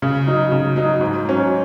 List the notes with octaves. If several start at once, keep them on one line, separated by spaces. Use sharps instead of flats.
C#3
F#3 D#4
C#3
F#3 D#4
G#2
F#3 C#4